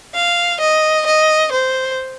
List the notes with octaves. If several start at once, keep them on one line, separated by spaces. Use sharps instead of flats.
F5
D#5
D#5
C5